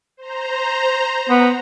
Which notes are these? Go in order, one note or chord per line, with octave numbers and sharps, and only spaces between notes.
C5 A#5
B3